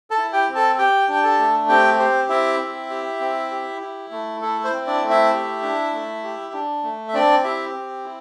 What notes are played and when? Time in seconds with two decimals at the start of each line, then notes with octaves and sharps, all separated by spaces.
0.10 A4 A5
0.18 E4
0.33 G4 G5
0.48 C4
0.55 A4 A5
0.78 G4 G5
1.08 D4 G5
1.23 A4 A5
1.39 A3
1.69 C4 G4 G5
1.99 G4 C5
2.29 C4 E4 E5
2.60 C4
2.90 G4
3.20 C4
3.51 G4
3.81 E4
4.11 A3
4.41 E4 A4
4.64 C5
4.72 C4
4.87 D4 D5
5.02 A3
5.09 E4 E5
5.33 G4
5.62 D4
5.93 A3
6.23 G4
6.53 D4
6.83 A3
7.08 E5
7.14 C4 D4 D5
7.44 E4 G4 E5
7.74 C4
8.05 E4